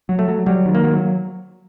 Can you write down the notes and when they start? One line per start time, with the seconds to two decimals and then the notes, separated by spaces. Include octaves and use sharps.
0.09 F#3
0.19 A3
0.28 F#3
0.46 F#3 G3
0.65 D#3
0.75 A#3
0.84 F#3